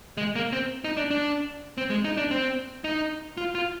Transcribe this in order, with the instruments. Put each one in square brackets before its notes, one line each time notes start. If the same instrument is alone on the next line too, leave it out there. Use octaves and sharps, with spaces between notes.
[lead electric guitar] G#3
A#3
C4
D#4
D4
D4
C4
G#3
D#4
D4
C4
D#4
F4
F4